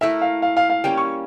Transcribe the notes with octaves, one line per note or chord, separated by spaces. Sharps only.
A3 E4 A#4 E5
F5
F5
F5
F5
G3 A#3 C#4 G5
C#6